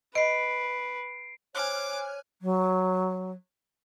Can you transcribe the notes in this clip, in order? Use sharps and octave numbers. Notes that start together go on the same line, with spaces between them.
B4 D#5 C7 D7
C5 C#5 G#5 D6 F6 F#6
F#3